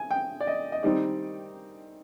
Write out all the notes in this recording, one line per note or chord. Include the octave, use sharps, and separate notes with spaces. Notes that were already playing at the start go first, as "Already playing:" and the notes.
Already playing: G#5
G5
D5
D#5
D#5
D#3 G3 C4 D#4 D5